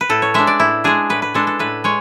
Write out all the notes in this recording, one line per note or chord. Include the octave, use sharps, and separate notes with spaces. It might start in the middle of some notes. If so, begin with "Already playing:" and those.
B4
A2 A4
C#5
G#3 D4 E5
D5
A2 E4
G#3 D4 G#4
A2 B4
B4
G#3 D4 A4
A4
A2 B4
G#3 C#5